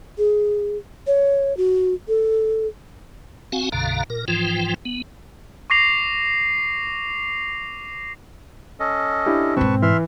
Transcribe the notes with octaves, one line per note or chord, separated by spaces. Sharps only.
G#4
C#5
F#4
A4
C4 F#4 F5 F#5 G#5
B1 F#2 B2 D3 F5 A#5
A#2 A#4
G#2 E3 F3 F4 G5
B3
C#6 D6 A#6 C7 F7
C#4 A4 D#5
D4 E4 G4
E1 G#2 C4 B4 A5 C#6
E3 E5 C6 F6